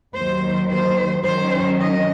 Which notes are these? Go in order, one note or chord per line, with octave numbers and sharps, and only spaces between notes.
D#2 D#3 F#3 C5
C5
F#2 D#3 F#3 C#4 C5
D#5